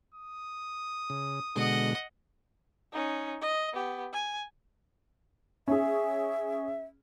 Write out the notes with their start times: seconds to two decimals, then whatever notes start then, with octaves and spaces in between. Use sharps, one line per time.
0.14 D#6
1.10 C#3
1.56 B2 D3 G#3 D#5 F#5
2.93 C#4 D#4
3.41 D#5
3.73 B3 G4
4.13 G#5
5.68 C#4 G#4 E5